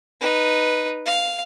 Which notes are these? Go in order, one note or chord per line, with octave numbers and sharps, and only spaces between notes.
D#4 B4
F5